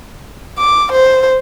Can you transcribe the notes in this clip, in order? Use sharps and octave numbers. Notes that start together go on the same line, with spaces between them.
D6
C5